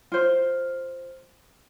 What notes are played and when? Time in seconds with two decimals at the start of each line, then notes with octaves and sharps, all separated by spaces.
0.12 F4 C5